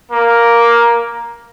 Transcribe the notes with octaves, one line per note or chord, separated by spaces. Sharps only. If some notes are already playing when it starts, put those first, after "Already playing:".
A#3